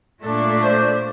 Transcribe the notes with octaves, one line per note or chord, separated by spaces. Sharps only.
A#2 A3 D4 A4
C5